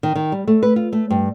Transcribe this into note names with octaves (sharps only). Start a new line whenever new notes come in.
D#3
D#3
G3
A3
B4
F4
A3
G2